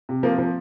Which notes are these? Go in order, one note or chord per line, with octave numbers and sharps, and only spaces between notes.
C3
F3 A#3
F3